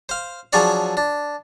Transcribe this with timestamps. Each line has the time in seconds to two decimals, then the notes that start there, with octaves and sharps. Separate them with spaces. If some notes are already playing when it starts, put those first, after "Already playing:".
0.09 C5 F5
0.53 F3 F#3 D4 G#4 C#5 D5
0.97 D4